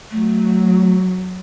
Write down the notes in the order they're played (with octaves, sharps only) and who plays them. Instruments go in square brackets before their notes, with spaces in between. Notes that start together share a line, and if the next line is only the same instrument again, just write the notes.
[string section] F#3 [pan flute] A3